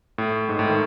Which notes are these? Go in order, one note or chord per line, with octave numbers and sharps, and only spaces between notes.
A2
G#2
A2
D#3